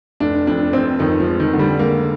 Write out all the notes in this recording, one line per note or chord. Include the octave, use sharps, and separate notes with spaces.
F1 D4
F2 D4
F1 C4
F2 D#3
F3
G#3
D#3
D3
G3
G#3 A#3